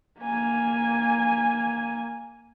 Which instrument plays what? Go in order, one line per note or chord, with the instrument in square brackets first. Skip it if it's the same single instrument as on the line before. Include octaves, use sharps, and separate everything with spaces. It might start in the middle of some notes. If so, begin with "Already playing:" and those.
[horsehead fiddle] A#3 G#5